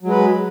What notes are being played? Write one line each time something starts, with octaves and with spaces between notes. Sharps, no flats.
F#3 G#3 B4